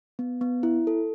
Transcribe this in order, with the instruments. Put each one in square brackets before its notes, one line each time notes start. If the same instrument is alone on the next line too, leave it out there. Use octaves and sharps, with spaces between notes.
[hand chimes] B3
B3
E4
A4